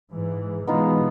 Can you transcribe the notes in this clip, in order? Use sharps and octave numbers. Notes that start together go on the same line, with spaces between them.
G#2 E3
B2 E3 G#3 B3 D#4 F4